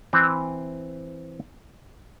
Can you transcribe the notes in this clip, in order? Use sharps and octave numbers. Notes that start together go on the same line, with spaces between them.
E3 C4